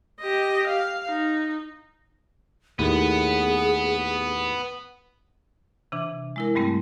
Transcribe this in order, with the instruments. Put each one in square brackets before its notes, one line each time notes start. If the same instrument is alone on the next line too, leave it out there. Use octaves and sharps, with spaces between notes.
[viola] G4 D#5
F5
D#4
[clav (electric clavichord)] D#2 A2 [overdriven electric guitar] B3 [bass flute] G#4
[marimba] C3 E3 D4
G#3 E4 A#4
G2 G3 A3 C4